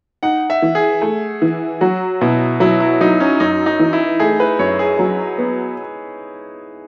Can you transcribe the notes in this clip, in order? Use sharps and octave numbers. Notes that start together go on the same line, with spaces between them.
D#4 F#5
E5
E3
G#4
A3
E3
F#3 F#4
B2 E4
F#3 E4
E4
F#3 D#4
C#4
F#2 D#4
D#4
E3
E4
A3 G#4
B4
F#2 C#5
G#4
F#3
B3